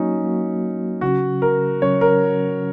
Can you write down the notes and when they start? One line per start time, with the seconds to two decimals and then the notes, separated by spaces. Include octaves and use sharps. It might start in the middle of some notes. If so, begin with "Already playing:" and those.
Already playing: F#3 A#3 C#4 D#4 F#4
0.22 F#3 A#3 F#4
1.01 C#3 F#3 C#4 F#4
1.42 A#4
1.82 C#3 F#3 C#4 C#5
2.01 A#4